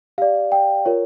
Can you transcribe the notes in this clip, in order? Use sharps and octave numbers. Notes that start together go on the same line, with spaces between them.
G4 D5 F5
G5
F4 A#4 C#5